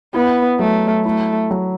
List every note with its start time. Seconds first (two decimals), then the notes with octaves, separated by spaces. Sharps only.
0.14 B3 E4
0.59 F#3 A3
1.05 A3 E4
1.51 F#3